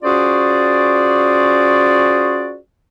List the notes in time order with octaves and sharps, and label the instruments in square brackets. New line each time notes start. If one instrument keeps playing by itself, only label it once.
[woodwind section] C#4 F4 F#4 G#4 C5 D5